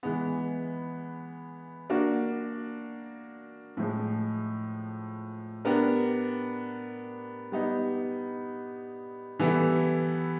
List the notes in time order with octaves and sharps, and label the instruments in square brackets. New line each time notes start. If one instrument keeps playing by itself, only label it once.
[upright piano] E3 G#3 B3
A#3 D4 F#4
A2 F3 G#3
B3 D4 G4 A#4
G3 B3 D#4
E3 G3 B3 E4 A4